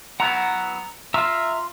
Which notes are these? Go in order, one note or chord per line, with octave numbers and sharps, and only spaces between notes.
F#3 B3 E4 F#5 A#5
F4 E5 A#5 E6